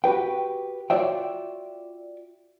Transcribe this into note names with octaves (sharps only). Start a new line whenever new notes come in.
F#4 G4 B4 G5
F4 F#4 C#5 D5 E5 G5